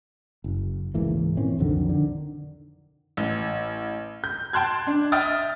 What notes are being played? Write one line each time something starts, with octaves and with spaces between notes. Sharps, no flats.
F#1
C#2 G#2 E3 A#3
A#2 E3 C4 C#4
B1 F2 D3 D#3
D3 D#3
A1
G6
G5 A5 C6 F#6 G#6
D4
E5 G5 D#6 F6 A6